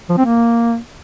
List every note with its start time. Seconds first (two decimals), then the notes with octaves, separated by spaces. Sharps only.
0.09 F3
0.17 C4
0.26 A#3